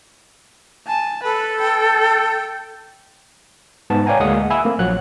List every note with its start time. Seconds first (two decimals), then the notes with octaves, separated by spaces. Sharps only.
0.88 G#5 A5
1.24 A4 B4
1.60 G5
3.90 G#2 B3 A5
4.06 C#5 D5 F5 G5 G#5 A#5
4.20 D2 G#3 A#3 F5 F#5 D#6
4.50 E5 G#5 B5 E6
4.65 A3 A#3 C4
4.79 A#1 F3 F#3 F#5 F#6